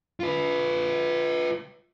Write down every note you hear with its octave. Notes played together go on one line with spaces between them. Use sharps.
F4 B4